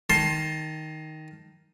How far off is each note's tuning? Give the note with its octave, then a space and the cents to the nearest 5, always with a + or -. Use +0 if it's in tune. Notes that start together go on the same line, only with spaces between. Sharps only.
D#3 +5 A5 +0 C6 +20